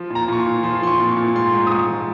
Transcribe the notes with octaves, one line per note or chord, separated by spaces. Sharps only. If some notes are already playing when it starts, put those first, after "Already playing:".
Already playing: F3
A#2 A#5
A#2 C#6
C6
A#2
F3 C6
F3 C6
C#6
A#2
A#2 C#6
G#2 C6
G#2
D#6
G#2 C#6
F3